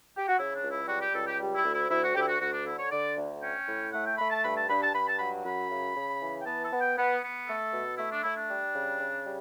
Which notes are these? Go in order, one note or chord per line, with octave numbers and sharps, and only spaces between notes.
G4
F#4
C#3 E4
D4
C#2
E4
G3 F#4
G4
C#2 A4
G4
G3
E4
D2
E4
D2 E4
F#4
D2 G4
E4
F#4
D2 F#4
D4
D3 E4
C#5
D3 D5
D2
C#4 G5
A2
A3 F#5
G5
A3 B5
A5
G2 B5
A5
G2 B5
A5
G2 B5
A5
F#3 B5
F#2 B5
C#3
C#3
E3
G5
B3 A5
A5
B3
G5
B3
B3
A3 A4
B2
A3 E4
D4
A3 E4
D4
G3
C#3
C#3
G3